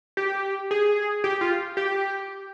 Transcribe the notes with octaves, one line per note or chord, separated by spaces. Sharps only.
G4
G#4
G4
F4
G4